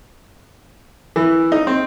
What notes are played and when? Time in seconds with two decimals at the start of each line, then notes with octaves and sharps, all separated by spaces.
1.16 E3
1.52 D#4
1.67 C4